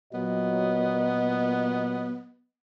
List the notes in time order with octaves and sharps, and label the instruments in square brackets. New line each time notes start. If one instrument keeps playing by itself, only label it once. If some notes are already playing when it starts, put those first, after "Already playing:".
[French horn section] A#2 F#3 D#5 [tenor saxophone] B3